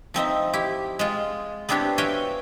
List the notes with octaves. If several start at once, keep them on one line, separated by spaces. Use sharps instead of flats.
F3 C4 D#4 E5
E4 G4
G#3 F4
B3 C4 D4 E4 G4 C#5
F#4 C#5 E5 F5 G5 G#5